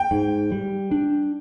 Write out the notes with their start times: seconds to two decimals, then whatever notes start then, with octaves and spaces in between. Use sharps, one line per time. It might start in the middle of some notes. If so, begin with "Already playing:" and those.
Already playing: G5
0.11 G#2
0.52 G3
0.91 D4